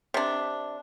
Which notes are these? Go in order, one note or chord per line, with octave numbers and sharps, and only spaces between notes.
C3 D4